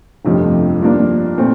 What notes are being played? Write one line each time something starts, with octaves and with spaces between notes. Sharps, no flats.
G1 F2 C3 F3 A3
G2 F3 A#3 D4
A#2 A3 C4